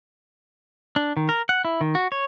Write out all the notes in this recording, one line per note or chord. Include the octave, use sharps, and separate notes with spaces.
D4
D#3
A#4
F#5
E4
D#3
F#4
C#5